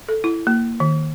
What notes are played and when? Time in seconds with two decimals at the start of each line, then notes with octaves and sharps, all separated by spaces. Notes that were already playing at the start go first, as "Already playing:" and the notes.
0.09 A4
0.24 E4
0.47 A#3
0.80 D#3